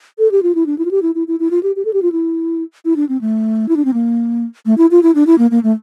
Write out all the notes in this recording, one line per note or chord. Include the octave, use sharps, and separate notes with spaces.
A4
G4
F4
E4
D4
E4
F4
G4
E4
E4
E4
E4
F4
G4
G4
A4
G4
F4
E4
E4
D4
C4
A3
E4
D4
C4
A#3
A3
E4
F4
E4
D4
E4
A#3
A#3
A3